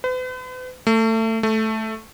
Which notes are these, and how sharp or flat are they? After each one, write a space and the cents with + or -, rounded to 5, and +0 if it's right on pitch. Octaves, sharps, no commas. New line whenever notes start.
B4 +45
A3 +25
A3 -5